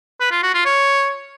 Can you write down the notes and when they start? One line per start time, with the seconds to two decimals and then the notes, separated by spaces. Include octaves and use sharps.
0.20 B4
0.32 F4
0.43 F#4
0.54 F4
0.65 C#5